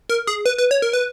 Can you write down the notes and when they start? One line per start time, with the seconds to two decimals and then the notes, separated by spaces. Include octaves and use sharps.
0.09 A#4
0.27 G#4
0.46 B4
0.58 B4
0.71 C#5
0.82 A#4
0.93 B4